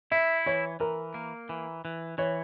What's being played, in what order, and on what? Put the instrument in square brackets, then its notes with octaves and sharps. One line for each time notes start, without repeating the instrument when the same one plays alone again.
[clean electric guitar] E4 [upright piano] E5
[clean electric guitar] E3 [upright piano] C#5
[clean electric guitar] E3 [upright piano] A#4
[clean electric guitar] A#3
E3
E3
[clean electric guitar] E3 [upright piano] C#5